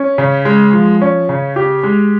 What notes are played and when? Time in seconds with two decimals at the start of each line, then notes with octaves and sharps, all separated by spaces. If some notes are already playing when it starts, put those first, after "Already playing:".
Already playing: C#4
0.18 C#3
0.45 G#3
0.73 F3
1.02 C#4
1.29 C#3
1.56 G4
1.83 G#3